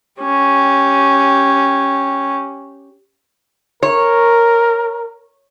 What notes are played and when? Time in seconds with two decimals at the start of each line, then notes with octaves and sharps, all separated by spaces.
0.21 C#4 G4
3.83 A#4 C#5